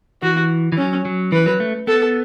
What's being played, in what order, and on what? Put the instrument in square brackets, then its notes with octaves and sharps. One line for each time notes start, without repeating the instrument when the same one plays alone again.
[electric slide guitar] E3 [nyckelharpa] F#4
[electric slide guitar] E3
[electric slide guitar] F#3 [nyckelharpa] C#4
[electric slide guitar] F#3
[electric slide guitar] E3 [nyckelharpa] B4
[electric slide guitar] F#3
A3
[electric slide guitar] B3 [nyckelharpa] A4